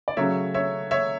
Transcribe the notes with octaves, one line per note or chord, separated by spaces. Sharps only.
D5
C#3 F#3 A3 C#5 E5
C#5 E5
C#5 E5